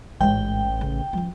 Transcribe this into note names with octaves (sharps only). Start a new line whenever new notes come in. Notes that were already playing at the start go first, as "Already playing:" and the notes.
A1 G#2 G#3 G5
C#3
F3 C#4